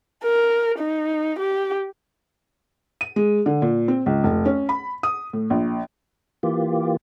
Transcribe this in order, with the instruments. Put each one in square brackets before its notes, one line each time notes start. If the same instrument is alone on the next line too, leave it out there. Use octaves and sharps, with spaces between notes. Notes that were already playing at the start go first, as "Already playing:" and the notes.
[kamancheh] A#4
D#4
G4
[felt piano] D#7
G#3
D3
A#2
C4
C#2
F1
C#4
B5
D#6
A2
A#1
[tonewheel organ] E3 A#3 F4 G4